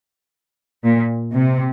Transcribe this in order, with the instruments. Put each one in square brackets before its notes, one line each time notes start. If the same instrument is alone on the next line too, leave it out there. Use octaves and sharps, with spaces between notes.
[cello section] A#2
C3